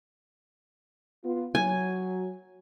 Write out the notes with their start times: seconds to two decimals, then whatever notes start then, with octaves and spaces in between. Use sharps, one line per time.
1.25 B3 F4
1.55 F#3 G#5